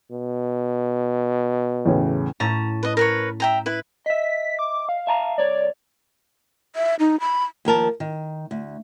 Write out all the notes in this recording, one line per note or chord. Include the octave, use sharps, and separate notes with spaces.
B2
E2 A2 C#3
A2 C#4 A5 A#5
B4 D#5
A#4 B4 C#5
E5 G5 A#5
E4 B4
D#5 E5 B6
D6
F5
E5 A5 A#5
C2 C#5 D5
E5
D#4
B5
D#2 F3 A#4 A5
D#3
D2